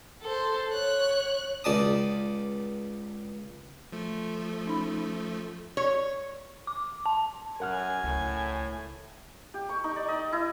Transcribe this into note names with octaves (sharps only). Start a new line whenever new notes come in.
A4 C5
C#5 F#6
C#2 D5 A5 D#6
F3 A3
C#4 D#4 B5
C#5
D6
A5
F#2 A#4 F#5 G#5 F6
C#2 A2
G4
C#6
D#4
D5
D#5
E4